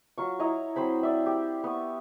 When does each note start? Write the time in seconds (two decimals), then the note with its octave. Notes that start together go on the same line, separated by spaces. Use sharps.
0.18 F#3 F4 C#6
0.39 E4 C#5 D#5 A#5
0.76 F#3 C4 C5 B5
1.03 D5 E5
1.26 G4
1.64 B3 C#6